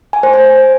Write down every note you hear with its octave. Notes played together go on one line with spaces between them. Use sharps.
G#5
C5
G#5